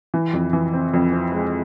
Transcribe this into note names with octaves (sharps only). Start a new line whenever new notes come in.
E3
F2
E3
C4
F2
C4
G#3